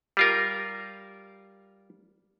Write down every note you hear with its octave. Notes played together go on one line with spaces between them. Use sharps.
G3 F4 A#4